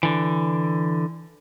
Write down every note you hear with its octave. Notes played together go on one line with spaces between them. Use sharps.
D3 E3